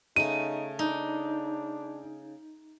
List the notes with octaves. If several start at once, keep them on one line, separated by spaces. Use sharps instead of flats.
C#3 A3 D#4 D#7
D4 D#4